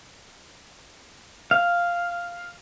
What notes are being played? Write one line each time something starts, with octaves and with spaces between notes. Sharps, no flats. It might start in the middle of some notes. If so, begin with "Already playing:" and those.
F5